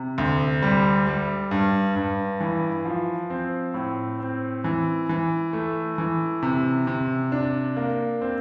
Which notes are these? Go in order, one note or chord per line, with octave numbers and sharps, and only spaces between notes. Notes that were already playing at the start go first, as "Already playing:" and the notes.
Already playing: C3
D2
G3
G3
G2
G2
E3
F3
C4
A2
C4
E3
E3
A3
E3
C3
C3
D4
A#3
C4